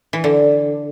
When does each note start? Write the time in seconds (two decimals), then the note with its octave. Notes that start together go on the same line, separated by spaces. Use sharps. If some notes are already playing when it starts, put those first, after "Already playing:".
0.13 E3
0.24 D3